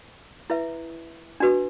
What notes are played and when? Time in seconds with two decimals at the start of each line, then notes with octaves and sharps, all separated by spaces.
0.50 E4 B4 E5
1.40 D4 F#4 B4